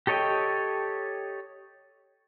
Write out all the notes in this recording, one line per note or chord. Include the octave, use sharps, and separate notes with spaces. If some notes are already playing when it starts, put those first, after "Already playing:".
G4 A4 C#5 D#5 G5